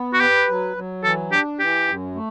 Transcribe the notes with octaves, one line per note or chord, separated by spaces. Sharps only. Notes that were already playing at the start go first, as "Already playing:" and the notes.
Already playing: B3
F#4
G4 B4
F#3
F#3
E3 A4
D4 G4
E3 G4
F#2
A3